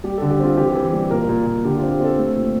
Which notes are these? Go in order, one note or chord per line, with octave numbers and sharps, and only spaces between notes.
G3 G4
D3 A4
G4
C4 F4
E3 G4
E3
G3
A#2 A#4
A#2
A#2
D3 G4
C4 F4
G4
C4 A4
A3
A#2